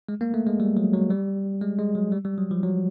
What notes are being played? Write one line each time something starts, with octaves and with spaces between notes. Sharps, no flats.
G#3
A#3
A3
G#3
G3
F#3
F#3
G3
G#3
G#3
F#3
G3
G3
F#3
F3
F#3